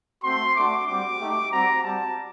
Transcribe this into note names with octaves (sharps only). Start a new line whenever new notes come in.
A3 C4 F#4 C6
A3 D4 F#4 D6
G3 C4 F#4 D6
A3 D#4 G4
G3 C4 F#4 A#5
G3 C4 F#4 A5